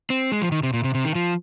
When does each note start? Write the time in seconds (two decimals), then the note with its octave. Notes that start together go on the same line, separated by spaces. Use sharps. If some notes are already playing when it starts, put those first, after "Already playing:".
0.10 C4
0.32 G#3
0.42 F3
0.52 D#3
0.63 C3
0.73 A#2
0.84 C3
0.95 C3
1.05 D#3
1.15 F3